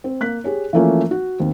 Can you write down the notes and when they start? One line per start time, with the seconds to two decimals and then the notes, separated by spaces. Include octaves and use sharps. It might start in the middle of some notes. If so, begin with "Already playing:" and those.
0.04 C4
0.20 A#3 F#6 B6
0.44 G4 G#4 C#5
0.73 E3 F3 A3 A#3 C#4 F4
1.11 F#4
1.40 D#2 C4